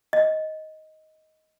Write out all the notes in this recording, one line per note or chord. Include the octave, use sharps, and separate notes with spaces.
D#5